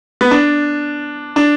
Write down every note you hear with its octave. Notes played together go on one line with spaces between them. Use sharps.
B3
D4
D4